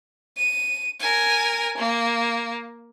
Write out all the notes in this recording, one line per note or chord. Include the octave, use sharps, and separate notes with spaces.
D#7
A#4 G#5
A#3